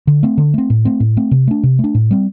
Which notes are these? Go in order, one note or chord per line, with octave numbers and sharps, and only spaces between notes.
D3
A3 C4
D3
A3 C4
A2
A3 C4
A2
A3 C4
C3
A3 D4
C3
A3
D4
A2
G3 C4